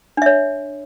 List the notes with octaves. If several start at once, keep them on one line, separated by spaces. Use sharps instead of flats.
D4 C#5 E5